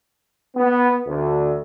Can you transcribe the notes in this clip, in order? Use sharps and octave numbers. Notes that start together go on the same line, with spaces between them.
B3
D2